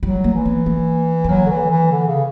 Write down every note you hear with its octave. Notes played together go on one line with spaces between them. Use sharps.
F#3 G3
A#3
E3
B3
A#3
B3
F#3 A#3
D3
E3
E3
D3
C#3